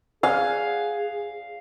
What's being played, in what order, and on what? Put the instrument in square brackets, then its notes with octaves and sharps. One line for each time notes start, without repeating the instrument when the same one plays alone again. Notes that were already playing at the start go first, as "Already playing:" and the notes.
[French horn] G#4 [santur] F5 [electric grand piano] F#5 G#5